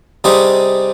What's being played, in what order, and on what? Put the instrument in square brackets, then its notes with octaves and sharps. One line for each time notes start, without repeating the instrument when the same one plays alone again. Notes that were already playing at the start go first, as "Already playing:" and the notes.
[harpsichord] C3 G3 C4 D#4 G#4